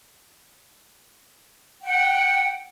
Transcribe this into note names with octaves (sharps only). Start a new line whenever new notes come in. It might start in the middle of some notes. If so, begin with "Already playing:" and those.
F#5 G5